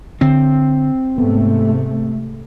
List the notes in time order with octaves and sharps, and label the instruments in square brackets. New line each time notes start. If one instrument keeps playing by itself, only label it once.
[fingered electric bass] D3 [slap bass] C4
[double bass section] G#2 C3 A3 [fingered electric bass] B3